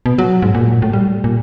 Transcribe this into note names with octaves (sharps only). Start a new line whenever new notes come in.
B2
F#3
G#2
A#2
A2
G3
A#2